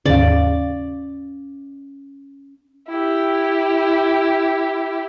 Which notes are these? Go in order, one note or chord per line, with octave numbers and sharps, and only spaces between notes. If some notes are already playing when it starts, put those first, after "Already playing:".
D#2 G#2 C#3 C#4 D5 F5
E4 G4